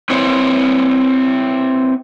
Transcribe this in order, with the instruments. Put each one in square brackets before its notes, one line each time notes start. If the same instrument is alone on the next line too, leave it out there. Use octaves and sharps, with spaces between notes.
[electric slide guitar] C4 E4 B4 C#5